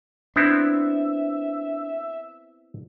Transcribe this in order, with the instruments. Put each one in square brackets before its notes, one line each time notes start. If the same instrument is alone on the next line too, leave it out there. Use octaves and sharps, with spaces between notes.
[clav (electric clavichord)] B3 C4 E4 [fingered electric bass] D4 [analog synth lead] E5